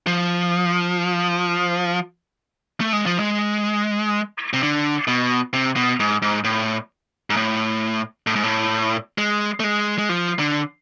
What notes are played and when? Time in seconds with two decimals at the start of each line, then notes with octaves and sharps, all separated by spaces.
0.07 F3
2.80 A3
2.93 G#3
3.06 F3
3.20 G#3
4.53 C3
4.63 D3
5.07 B2
5.53 C3
5.76 B2
6.00 G#2
6.22 G#2
6.44 A2
7.30 G#2
7.36 A2
8.27 A2
8.36 G#2
8.43 A2
9.18 G#3
9.60 A3
9.64 G#3
9.98 G#3
10.09 F3
10.39 D3